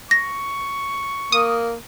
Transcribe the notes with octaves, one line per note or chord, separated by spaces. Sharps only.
C#6 A#6
A#3 D#6